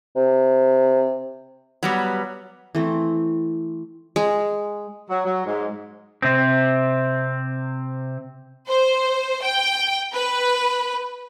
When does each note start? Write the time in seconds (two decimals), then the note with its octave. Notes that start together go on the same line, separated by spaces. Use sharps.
0.16 C3
1.83 F#3 G3 B3
2.75 E3 A3 C4
4.16 G#3
5.10 F#3
5.25 F#3
5.45 G#2
6.22 C3 C4
8.69 C5
9.43 G5
10.13 B4